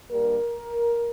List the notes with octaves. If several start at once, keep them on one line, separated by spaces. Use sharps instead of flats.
G2 G3 A#3 A#4